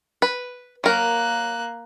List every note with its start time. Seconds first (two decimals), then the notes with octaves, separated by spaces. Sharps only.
0.22 B4
0.84 F#3 A#3 A#4 F#6